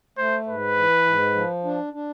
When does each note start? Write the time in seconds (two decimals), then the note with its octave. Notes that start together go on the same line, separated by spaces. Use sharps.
0.17 A3 C5
0.47 G#2 B4
0.77 E3
1.05 G#2
1.35 F3
1.64 D4
1.93 D4